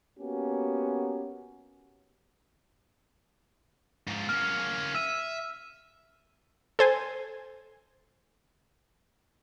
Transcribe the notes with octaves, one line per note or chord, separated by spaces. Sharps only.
A#3 B3 C#4 F#4 G4
G#2 F3
A#3 C#4 F6
E5 E6 D#7
A4 C5 G#5